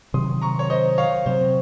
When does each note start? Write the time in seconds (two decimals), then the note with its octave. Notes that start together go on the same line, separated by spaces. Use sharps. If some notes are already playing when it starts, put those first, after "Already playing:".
0.14 C3 D#3 F#3 C6 D#6
0.42 A#5 C#6
0.59 C#5
0.70 C5 D#5
0.98 C#5 F5
1.26 C3 F#3 C4 C5